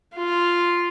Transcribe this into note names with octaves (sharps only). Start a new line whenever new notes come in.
F4